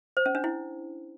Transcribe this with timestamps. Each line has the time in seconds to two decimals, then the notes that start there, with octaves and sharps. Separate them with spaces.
0.17 C5
0.26 C#4
0.35 D4
0.44 E4